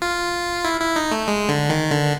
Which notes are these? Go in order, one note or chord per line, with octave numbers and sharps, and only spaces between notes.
F4
E4
E4
D#4
A3
G#3
D3
D#3
D3